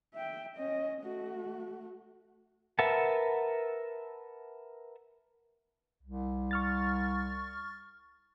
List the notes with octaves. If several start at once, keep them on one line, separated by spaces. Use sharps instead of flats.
E5 G5
C#4 D#5
A3 F#4
A#4 B4 E5 F#5 A5
C2
C#6 F6 A6